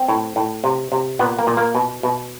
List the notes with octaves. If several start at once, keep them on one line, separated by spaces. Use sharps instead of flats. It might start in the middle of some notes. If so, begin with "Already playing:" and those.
Already playing: C4
A2
A2
C3
C3
A#2 B3
A#3
A#2
A#3
B2
B2